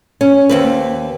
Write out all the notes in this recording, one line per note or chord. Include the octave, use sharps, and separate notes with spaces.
C#4
D#2 C4 B4